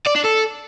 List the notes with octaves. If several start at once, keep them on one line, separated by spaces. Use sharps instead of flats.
D5
D4
A4